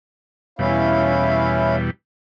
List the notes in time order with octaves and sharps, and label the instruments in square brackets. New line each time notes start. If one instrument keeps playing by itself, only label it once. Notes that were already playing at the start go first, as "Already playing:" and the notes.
[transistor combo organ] E2 B2 G3 [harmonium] C#4 E4 F5